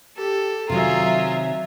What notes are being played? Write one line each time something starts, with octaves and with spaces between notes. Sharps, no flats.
G4 A4
C3 D#3 F#3 F4 G#4 E5 A#5